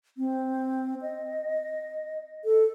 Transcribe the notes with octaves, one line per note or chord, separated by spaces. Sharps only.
C4
D#5
A4